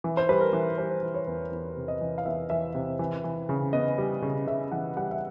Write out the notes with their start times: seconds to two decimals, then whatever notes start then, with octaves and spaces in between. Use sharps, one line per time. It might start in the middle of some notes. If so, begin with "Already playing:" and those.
0.04 E3
0.17 C5
0.29 G3 B4
0.41 A#4
0.53 E3
0.78 G3 C5
1.03 E3
1.14 C#5
1.27 E2
1.51 E2
1.77 C3
1.88 D#5
2.01 E3
2.18 F5
2.26 E2 E5
2.50 E3 E5
2.75 C3
2.99 E3
3.24 E3
3.49 C#3
3.73 B3 D#5
3.98 G3
4.22 C#3
4.47 C#3 E5
4.72 E3 F#5
4.97 G3 F#5
5.11 E5